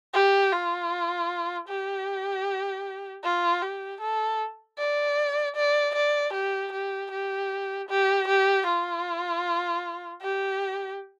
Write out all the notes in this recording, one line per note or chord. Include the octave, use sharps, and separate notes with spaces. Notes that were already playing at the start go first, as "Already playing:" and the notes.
G4
F4
G4
F4
G4
A4
D5
D5
D5
G4
G4
G4
G4
G4
F4
G4